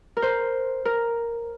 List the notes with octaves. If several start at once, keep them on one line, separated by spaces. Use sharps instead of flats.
A#4
C5
A#4